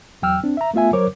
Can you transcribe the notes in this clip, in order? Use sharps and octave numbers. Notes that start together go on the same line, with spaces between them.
E2 F#3 G5 E6 F6
C4 D4
E5 A#5
A3 B3 F4 E5 G#5
F#3 A#4 C5 C#5 D6